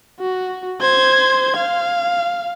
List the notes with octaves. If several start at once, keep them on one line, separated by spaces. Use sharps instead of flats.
F#4
C5 G#6
F5